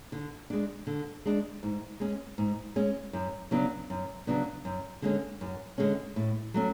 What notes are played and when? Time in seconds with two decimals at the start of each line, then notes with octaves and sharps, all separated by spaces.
0.12 D3
0.50 G#3 D4
0.87 D3
1.26 G#3 D4
1.63 G#2
2.00 G#3 C#4
2.38 G#2
2.76 G#3 C#4
3.13 F#2
3.51 C#3 F#3 B3 D4
3.90 F#2
4.27 C#3 F#3 B3 D4
4.65 F#2
5.02 D3 G#3 C#4
5.41 F#2
5.78 D3 G#3 C#4
6.16 A2
6.54 F#3 A3 C#4